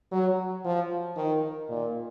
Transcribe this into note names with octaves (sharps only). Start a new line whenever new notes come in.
F#3
F3
D#3
A#2